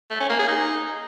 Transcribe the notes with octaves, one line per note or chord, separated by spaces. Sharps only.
A3
C#4
A#3
G#4
D#4